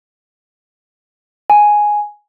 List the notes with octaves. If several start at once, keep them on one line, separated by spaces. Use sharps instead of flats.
G#5